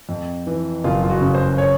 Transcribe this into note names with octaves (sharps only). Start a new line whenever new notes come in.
F2
E3
F#1 F4
F4
F#4
C#3
C5
C#5